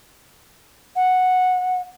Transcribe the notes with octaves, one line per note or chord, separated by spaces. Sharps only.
F#5